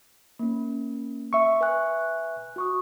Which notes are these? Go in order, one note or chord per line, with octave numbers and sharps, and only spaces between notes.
A#3 C#4
E5 C#6
B4 G#5 F#6
F#4 C#6 D#6